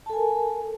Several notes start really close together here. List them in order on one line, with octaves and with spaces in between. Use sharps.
A5 A4 G#5 A#4